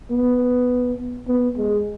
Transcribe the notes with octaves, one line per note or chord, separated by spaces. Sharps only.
B3
B3
G#3